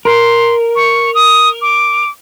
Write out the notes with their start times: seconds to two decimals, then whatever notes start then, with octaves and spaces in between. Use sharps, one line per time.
0.05 A#4 C6
0.76 C#6
1.15 D#6
1.62 D6